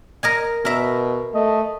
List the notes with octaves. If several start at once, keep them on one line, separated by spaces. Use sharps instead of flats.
A#4 D#5 G#5
B2 A#4 E5
A3 D#5